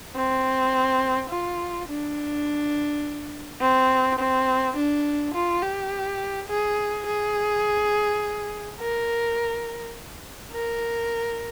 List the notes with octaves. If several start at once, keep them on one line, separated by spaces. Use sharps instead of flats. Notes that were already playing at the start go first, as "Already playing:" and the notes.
C4
F4
D4
C4
C4
D4
F4
G4
G#4
G#4
A#4
A#4